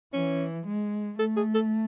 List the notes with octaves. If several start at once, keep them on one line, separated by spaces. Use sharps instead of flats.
E3 C#4
G#3
A3 A4
G#4
A4